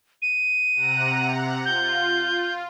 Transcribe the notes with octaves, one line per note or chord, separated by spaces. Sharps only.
D#7
C3 F#5 A#5
F4 G6